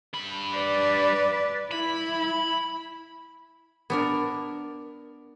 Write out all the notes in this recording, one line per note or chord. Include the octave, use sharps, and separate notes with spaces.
G2 B5
B4 D5
E4 B5
B3 D4 A#4